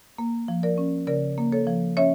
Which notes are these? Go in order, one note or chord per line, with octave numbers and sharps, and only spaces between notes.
A#3
F3
A#4 D5
C#4
C#3 A#4 D5
A#3
A4 C#5
F3
C#4 C#5 E5